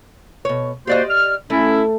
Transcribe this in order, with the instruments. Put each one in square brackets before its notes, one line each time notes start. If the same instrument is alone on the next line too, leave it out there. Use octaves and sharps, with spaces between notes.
[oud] B2 C#5
[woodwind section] A#3 F#4 C5 [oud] G4 D5 D#5
[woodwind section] F6
[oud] A3 [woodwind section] C#4 E4